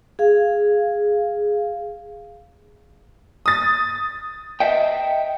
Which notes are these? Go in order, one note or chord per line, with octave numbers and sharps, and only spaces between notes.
G#4 F5
D#6 A6
D#5 E5 G5